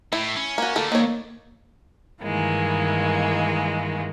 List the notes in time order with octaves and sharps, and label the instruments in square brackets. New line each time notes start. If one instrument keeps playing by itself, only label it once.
[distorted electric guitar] A2 [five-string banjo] E4
[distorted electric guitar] C#4
[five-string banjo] A#3 F#4
[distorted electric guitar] D3 A3 [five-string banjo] A#3 A4
[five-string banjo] D#3 C#5 [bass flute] A#3
[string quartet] G2 D#3 E3 G#3 A#3